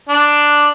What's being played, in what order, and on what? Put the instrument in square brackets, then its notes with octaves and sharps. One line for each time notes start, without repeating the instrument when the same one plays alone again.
[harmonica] D4